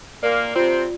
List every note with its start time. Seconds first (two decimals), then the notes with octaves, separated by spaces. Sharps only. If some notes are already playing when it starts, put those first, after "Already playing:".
0.22 A#2 A#3 D5
0.56 C3 C4 F4